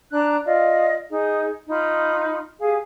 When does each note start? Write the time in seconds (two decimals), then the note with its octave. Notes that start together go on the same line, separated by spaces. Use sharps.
0.12 D4 A#5 F#6
0.46 F4 D5 D#5
1.09 D#4 G#4
1.70 D#4 F4 B5
2.60 G4 G#4 F5 G#5